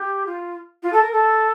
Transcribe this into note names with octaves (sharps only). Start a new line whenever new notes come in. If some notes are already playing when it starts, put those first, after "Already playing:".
Already playing: G4
F4
F4
A4
A#4
A4